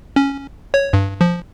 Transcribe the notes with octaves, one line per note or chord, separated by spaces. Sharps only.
C#4
C#5
G2
F3